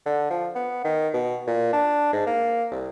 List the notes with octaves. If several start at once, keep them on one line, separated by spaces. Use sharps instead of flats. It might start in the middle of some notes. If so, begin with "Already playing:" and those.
D3
F3
B3
D#3
B2
A#2
D4
G#2
A#3
C2